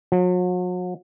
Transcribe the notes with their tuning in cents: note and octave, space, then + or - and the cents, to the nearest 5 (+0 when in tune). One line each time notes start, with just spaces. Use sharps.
F#3 -40